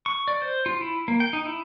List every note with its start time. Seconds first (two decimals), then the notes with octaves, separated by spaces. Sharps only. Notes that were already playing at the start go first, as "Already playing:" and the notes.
0.06 C#6
0.28 D5
0.42 C5
0.66 F4
0.81 E4
1.08 A#3
1.20 G5
1.33 D#4
1.45 E4